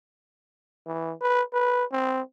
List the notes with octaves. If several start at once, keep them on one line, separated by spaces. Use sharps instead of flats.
E3
B4
B4
C4